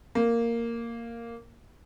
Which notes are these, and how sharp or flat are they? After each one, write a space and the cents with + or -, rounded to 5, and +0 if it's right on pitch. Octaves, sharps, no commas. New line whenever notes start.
A#3 -5